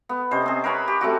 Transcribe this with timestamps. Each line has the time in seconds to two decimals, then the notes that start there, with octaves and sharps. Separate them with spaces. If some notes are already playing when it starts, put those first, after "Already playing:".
0.09 B3
0.31 C3 C#4 C5 D#5
0.46 C4 G#4
0.64 A#4 B4 C#5 G#5
0.88 G4
1.01 A3 C4 F#4